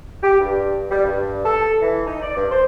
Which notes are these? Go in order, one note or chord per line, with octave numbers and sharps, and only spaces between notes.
G4
G2
G3
G2
A4
E3
D#4
D5
G2
C5